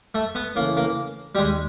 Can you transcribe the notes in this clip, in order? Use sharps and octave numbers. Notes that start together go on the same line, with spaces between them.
A3
B3
C#3 E3 A3 A#3 C#4
A#3
G3
D#2 G#3